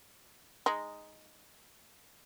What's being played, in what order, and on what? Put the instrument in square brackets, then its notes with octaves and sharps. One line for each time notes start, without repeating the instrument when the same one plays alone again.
[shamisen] G#3 D#4